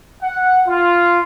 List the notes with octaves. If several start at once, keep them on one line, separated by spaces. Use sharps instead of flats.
F#5
F4